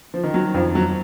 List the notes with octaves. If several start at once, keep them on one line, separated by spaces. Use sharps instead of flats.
F3
D#3
F#3
F2 F3
F#3